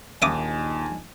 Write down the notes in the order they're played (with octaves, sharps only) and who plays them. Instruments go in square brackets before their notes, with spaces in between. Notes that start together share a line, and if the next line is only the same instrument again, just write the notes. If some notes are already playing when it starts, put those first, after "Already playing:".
[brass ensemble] A#1 D#4 G#5 [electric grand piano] D#2 [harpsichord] E5 D6 D#6